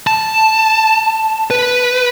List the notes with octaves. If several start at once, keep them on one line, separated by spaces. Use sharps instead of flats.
A5
B4